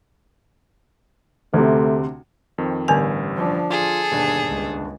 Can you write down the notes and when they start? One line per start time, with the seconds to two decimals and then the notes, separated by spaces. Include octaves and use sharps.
1.54 D2 C3 A3
2.58 F2 D#3 C4
2.88 A1 G2 D3 G3 B3 G#5
3.36 F3 D4
3.70 F4 G#4 A4
4.11 G1 D#2 B2 D4
4.47 C#2